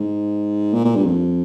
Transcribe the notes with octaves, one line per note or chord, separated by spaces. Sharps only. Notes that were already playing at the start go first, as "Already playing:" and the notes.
Already playing: G#2
A#2
A#2
G2
F2